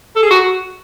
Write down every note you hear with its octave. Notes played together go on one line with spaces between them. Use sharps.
A4
G#4
F#4